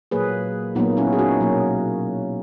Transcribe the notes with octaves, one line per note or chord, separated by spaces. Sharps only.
A#2 F#3 A#3 G#4 B4
A#2 F#3 A#3 B3 D#4
C#4 E4
G#4
D#4 F#4
B2 F#3 A#3